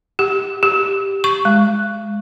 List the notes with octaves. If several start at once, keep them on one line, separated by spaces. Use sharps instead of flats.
G4
G4
C#6
G#3